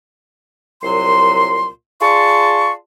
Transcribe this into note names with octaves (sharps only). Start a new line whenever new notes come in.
C2 A#2 F#3 C6
F4 G#4 D5 A5 C6 C#6